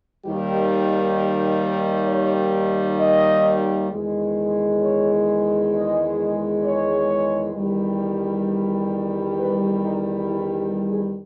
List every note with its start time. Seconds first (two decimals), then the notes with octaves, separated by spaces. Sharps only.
0.25 D#2 D#3 G3 G4
1.16 G4
1.62 A#4
2.07 C#5
2.99 D#5
3.90 E2 D#3 G#3
4.80 C#5
5.71 D#5
6.63 C#5
7.53 E2 D#3 G3
9.37 B4
9.82 D#4
10.26 E4
10.57 G4
10.88 G#4